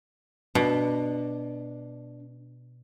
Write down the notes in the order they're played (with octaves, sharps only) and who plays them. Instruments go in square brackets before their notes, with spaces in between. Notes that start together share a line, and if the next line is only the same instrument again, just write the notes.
[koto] B2 [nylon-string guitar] D4